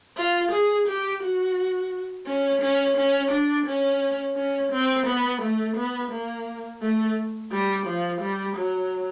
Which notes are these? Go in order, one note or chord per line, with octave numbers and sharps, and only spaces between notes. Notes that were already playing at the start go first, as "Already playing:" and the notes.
F4
G#4
G4
F#4
C#4
C#4
C#4
D4
C#4
C#4
C4
B3
A3
B3
A#3
A3
G3
F3
G3
F#3